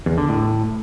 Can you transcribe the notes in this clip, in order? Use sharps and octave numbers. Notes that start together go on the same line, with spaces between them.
E2
D3
A2